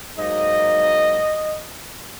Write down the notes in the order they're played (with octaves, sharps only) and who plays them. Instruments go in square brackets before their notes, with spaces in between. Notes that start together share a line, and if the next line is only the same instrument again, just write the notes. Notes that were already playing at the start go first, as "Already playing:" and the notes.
[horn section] G#2 F#3 A#3 D#5